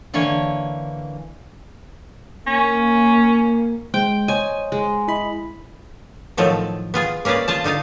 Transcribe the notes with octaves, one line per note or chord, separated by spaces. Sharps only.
D3 E3 A#3 C#5
A#3 C#4
G#3 C5 G5
C5 C#5 D#5 G#5
G#3
E4 D#5 B5
A2 D#3 F3 F#3 A4
B3 F4 G#4
A#3 C#4 G#4 B4 D5
F4 G#4 A5
D3 D#4 F4 F5